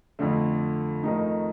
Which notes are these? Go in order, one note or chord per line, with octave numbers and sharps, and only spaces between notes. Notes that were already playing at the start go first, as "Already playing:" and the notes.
F2 D3 A3
F2 D#3 A3 D#4